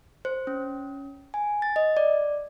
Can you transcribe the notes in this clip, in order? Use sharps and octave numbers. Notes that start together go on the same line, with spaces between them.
C5
C#4
G#5
A6
D#5
D5